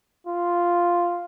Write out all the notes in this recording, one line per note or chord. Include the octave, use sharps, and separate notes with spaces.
F4